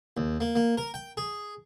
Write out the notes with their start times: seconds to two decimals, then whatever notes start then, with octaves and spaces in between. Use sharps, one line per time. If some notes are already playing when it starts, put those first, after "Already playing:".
0.17 D#2
0.40 A#3
0.55 A#3
0.77 A#4
0.94 G5
1.17 G#4